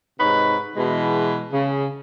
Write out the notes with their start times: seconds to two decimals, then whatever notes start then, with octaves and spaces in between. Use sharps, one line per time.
0.20 G#2 C3 D#4 B4 C#5 B5
0.77 B2 E3 G#3
1.52 C#3